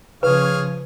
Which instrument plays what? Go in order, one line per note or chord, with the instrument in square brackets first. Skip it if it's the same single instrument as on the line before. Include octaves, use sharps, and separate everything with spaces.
[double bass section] C#3 F3 [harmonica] G#4 C#5 F5 [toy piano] B4